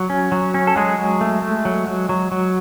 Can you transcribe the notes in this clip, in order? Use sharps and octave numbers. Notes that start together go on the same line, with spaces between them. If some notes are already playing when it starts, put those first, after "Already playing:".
Already playing: F#3
C#4
F#3
C#4
A4
F#3 G#3 G#4
F#3
A3
A3
F#3
F#3
F#3
F#3